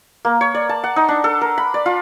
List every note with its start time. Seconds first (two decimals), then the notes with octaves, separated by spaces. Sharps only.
0.25 A#3
0.41 C#5
0.55 D5
0.69 A5
0.84 F#5
0.96 D#4
1.08 D4
1.24 A4
1.41 A#4
1.58 B5
1.74 D5
1.86 F4